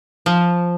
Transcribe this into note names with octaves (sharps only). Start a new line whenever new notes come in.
F3